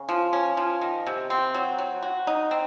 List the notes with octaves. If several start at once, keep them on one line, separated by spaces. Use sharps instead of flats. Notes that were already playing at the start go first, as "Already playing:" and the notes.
Already playing: C#3
F3
C#4
F3
D#3
C3
C4
F#3
F#3
F#4
D#4
C4